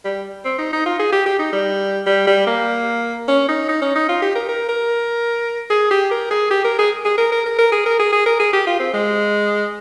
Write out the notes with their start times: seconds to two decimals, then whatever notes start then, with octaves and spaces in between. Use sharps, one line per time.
0.05 G3
0.45 C4
0.58 D#4
0.73 D#4
0.86 F4
1.00 G#4
1.12 G4
1.26 G4
1.39 D#4
1.53 G3
2.06 G3
2.27 G3
2.47 A#3
3.28 C#4
3.48 D#4
3.69 D#4
3.82 C#4
3.96 D#4
4.09 F4
4.22 G4
4.35 A#4
4.49 A#4
4.69 A#4
5.70 G#4
5.91 G4
6.11 A#4
6.31 G#4
6.50 G4
6.64 A#4
6.79 G#4
7.05 G#4
7.18 A#4
7.32 A#4
7.46 A#4
7.59 A#4
7.72 G#4
7.86 A#4
7.99 G#4
8.13 G#4
8.26 A#4
8.40 G#4
8.53 G4
8.67 F4
8.80 C4
8.94 G#3